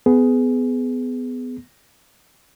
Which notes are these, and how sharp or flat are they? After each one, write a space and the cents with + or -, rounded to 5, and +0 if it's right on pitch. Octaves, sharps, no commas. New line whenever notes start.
B3 +20 G#4 +10